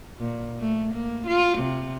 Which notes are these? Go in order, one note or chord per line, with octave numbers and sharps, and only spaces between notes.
A#2
A3
A#3
F4
C3